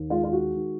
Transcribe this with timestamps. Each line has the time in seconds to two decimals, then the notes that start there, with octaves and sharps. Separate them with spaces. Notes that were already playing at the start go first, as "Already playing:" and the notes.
Already playing: D#2
0.10 G#3 F4
0.24 F4
0.33 F#4
0.56 D#3